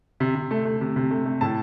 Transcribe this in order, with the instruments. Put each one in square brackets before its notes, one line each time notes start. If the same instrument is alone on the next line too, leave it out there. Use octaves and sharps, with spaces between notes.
[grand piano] C3
C3
A3
A3
C3
C3
A3
A3
A2 A5